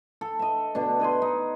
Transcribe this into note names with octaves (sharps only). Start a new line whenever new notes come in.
A4
D#5 E5
B2 D3 D4
B4 D#5 G#5 C6
D#4